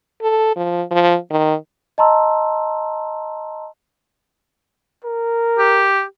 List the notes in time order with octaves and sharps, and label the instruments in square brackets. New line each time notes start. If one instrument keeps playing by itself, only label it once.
[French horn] A4
F3
F3
D#3
[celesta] D#5 A5 A#5 C6 E6
[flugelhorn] A#4
[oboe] G4